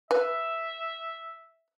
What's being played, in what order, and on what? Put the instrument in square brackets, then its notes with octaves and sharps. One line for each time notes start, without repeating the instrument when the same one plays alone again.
[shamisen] B4 G#5 [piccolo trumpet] E5